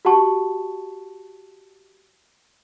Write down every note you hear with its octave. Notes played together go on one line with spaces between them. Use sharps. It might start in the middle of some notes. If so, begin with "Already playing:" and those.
F#4 G4 F#5 A5 C#6